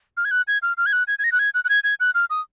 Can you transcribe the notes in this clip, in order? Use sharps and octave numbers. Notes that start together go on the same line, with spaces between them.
F6
G#6
F#6
G#6
F6
F6
G#6
F#6
G#6
G#6
A#6
F#6
G#6
F#6
F#6
G#6
G#6
F#6
F6
D#6